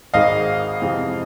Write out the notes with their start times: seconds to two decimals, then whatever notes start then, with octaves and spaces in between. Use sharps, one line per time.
0.14 G#1 G#2 D#3 G#3 D#5 F5
0.81 F2 C3 E3 G#3